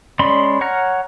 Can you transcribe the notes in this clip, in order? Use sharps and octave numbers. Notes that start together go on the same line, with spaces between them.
G#3 C#4 D5 B5 C6
C#5 F#5 A#5 F6